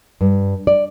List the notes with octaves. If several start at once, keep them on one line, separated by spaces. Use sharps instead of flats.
G2
D5